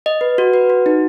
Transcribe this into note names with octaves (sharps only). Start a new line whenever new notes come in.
D#5
B4
F#4
B4
F#4
D#4